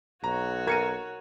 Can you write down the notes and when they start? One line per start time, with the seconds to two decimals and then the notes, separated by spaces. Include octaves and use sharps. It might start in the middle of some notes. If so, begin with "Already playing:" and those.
0.24 B1 F#4 C#5 A#5
0.67 A#4 G#6 C#7 D#7